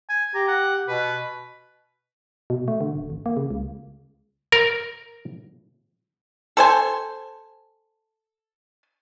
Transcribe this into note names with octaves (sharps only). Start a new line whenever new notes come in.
G#5
G4 A#5
F#5
B2 B4
B2
A3
D3
D1
G#1
A#3
C#3
C#2
A#4
A4 C5 G#5